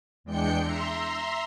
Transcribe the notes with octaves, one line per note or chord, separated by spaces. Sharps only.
E2 G#3 D4 G5 G6 C#7
E5 A#5 C6